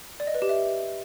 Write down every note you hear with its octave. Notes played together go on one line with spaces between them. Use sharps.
D5
D#5
B4
G4
E5